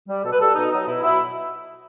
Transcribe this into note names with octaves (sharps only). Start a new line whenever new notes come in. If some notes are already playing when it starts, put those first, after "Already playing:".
G3
B2 A4
B4
G3 A4
B2 D#4
F#3 D#4
B2 E4
F#3 E4